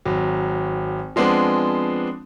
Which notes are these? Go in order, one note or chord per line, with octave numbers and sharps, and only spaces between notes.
G#1 F#3
F3 G#3 B3 C4 D4